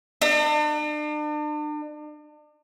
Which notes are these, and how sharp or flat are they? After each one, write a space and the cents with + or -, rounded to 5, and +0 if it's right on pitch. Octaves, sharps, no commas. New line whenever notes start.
D4 +40